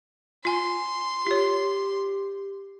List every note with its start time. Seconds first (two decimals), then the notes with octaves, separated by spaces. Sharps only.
0.45 F4 G#5 C6
1.27 F4 G4 C#5